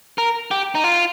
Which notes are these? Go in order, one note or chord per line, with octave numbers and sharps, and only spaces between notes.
A#4
G4
D#4
F4